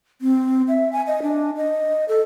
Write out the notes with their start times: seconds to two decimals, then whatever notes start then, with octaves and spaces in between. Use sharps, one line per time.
0.21 C4
0.68 E5
0.93 G#5
1.07 D#5
1.23 D4
1.57 D#5
2.08 A4